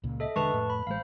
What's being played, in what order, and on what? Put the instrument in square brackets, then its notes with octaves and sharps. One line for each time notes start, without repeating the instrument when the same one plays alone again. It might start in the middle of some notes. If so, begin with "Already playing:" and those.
[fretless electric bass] C#2 A#2
[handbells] A4 D#5 E5
[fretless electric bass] E1 D3 G#3 [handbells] B4 A5 C#6
[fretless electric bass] F2 A2
[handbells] B5
[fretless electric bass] A1 G#3 [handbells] C5 F5